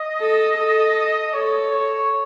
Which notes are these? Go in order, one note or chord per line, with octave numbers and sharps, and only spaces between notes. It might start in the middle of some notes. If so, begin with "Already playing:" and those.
Already playing: D#5
A4
A4
A4 C#5
C#5